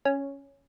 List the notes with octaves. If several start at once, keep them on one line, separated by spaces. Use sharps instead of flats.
C#4